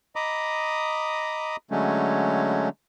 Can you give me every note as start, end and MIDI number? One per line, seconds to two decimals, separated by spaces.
0.16 1.56 75
0.16 1.56 82
0.16 1.56 83
0.16 1.56 86
0.16 1.56 87
1.71 2.69 50
1.71 2.69 54
1.71 2.69 56
1.71 2.69 57
1.71 2.69 61